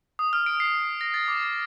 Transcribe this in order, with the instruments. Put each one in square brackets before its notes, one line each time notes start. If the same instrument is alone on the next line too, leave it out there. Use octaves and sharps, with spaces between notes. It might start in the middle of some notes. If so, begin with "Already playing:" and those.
[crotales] D#6
F6
D7
C7
A#6
A6
D6